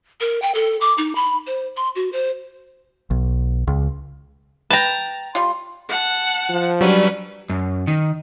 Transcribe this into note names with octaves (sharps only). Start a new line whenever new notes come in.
A#4
G5
A4
D6
D#4
B5
C5
C6
F#4
C5
B1
C#2
B4 G5 A5 A#5
G3 F4 C6
F#5 A5 F#6
F3
F#3 G3 C#4 D4 B4
F#2
D#3